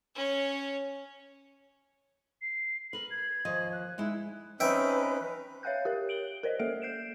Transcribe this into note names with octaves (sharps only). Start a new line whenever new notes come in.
C#4 C#5
C7
A#4 B4 F#7
G#6
D#2 F3 D#5
F#6
G#3 D#4 E4
C4 C#4 D#4 B4 E5 G5
C#5 E5 F5 G5 F#6 G6
G4 A#4 C#5
D7 F#7 G7
A#4 C5 D5 D#5
A#3 A4 E5 D7
G6 C7 D7 E7